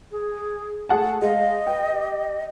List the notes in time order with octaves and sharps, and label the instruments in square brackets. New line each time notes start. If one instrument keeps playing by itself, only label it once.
[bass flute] G#4
[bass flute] A3 [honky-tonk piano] G#4 F#5 A5
[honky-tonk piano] G#3 [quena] D#5 [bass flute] F5
[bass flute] B4 [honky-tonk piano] G5
[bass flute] G4